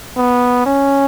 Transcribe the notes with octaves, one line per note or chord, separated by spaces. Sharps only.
B3
C#4